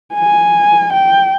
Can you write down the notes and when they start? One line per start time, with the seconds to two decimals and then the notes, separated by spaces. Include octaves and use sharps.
0.14 G#5
0.93 G5